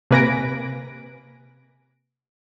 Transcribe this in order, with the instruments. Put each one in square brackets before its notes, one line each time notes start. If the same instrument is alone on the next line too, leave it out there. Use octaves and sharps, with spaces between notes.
[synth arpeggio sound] C3 A#3 B4 G#5 A#6 D7